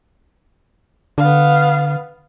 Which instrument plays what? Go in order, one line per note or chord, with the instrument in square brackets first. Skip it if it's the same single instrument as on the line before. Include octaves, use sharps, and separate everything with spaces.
[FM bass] D3 [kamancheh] B3 F5